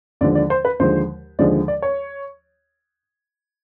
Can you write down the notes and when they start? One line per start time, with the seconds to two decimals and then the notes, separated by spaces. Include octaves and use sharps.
0.21 D#2 D3 F3 G#3 D5
0.35 D5
0.50 C5
0.65 B4
0.80 D#2 D3 F3 G#3 C5
1.39 D#2 D3 F3 G#3 D5
1.68 D5
1.82 C#5